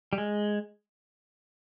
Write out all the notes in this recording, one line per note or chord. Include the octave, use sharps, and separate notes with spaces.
G3
G#3